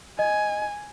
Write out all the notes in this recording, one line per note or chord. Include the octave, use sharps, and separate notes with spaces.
D#5 G#5